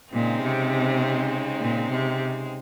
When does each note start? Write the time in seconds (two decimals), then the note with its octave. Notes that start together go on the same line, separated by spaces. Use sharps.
0.13 A#2 C#3 G#3 C4 D#4
0.42 C3
1.61 A#2
1.91 C3